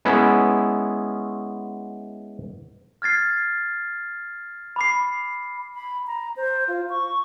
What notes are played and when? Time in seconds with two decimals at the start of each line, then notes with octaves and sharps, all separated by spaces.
0.05 G#3 B3 C#4 E4
3.02 F6 G#6 A6 C7
4.76 B5 D6 C7
5.74 B5
6.07 A#5
6.36 C5
6.68 F4
6.90 C#6